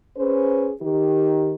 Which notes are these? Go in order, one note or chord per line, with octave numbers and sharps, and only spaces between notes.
C#4 G#4 B4 C5
D#3 D#4 G4